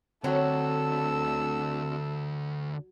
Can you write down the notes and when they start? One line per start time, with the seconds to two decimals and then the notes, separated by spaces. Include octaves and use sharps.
0.24 D2 D3 F#3 C4 F#4 A4 E6